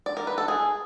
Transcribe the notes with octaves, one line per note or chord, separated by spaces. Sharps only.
D5
A#4
B4
A4
G#4